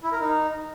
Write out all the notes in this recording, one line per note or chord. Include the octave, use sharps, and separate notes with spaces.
E4
A#4
D#4